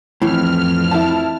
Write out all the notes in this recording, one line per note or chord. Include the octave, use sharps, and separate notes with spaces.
F2 A2 E3 F6
E4 A5